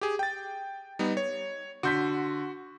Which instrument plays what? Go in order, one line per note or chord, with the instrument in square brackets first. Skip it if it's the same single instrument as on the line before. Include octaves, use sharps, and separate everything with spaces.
[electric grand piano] G4 G#4
G5 A6
G3 B3 D#4
C#5
[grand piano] D3 G6 B6 [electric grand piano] F#4 C6